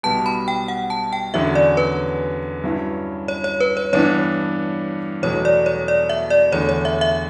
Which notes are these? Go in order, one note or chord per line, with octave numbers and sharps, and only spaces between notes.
B1 B2 G3 B3 A5
B5
G5
F#5
A5
G5
E2 D3 F#3 C#4 E5
D5
B4
G2 F#3 C#4 E4
C#5
C#5
B4
C#5
G2 E3 B3 D4 C#5
E2 B2 F#3 A3 C#5
D5
C#5
D5
E5
D5
E2 D3 A3 C#5
C#5
E5
E5